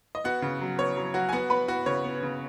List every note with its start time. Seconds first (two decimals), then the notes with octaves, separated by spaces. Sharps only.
0.15 D#5
0.24 B3 F#4 F#5
0.42 C#3
0.61 F#3
0.79 B3 C#5
0.97 F#3
1.14 F#3 F#4 F#5
1.29 G#5
1.32 B3 F#4 F#5
1.50 B3 B4 B5
1.68 B3 F#4 F#5
1.86 C#3 C#5
2.04 B3
2.23 C#3